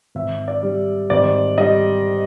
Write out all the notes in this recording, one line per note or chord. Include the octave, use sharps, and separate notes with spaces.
G#1 E5
D5
G3
G#1 D5
G3 D#5